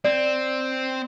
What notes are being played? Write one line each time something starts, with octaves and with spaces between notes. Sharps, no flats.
C4 D5